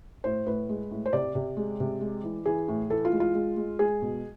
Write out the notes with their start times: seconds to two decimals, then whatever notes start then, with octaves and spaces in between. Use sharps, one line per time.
0.24 A2 C5
0.46 A2 B4
0.69 G#3
0.91 A2
1.06 C5
1.13 C3 D5
1.35 C3
1.57 G#3
1.80 C3
2.01 G#3
2.23 E3
2.46 E3 G#4
2.68 A2
2.90 E3 A4
3.05 F4
3.13 G#3
3.20 F4
3.34 G#3
3.57 G#3
3.79 G#3 G#4
4.02 B2